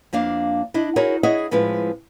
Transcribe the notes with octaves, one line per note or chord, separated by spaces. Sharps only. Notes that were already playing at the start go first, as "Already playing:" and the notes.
F2 A#3 D4 F5
D4 E4 D#5
D#4 E4 F#4 G#4 A#4 C#5
E4 G#4 C#5 D#5 E5 F#5
A2 F3 G#3 C4 B4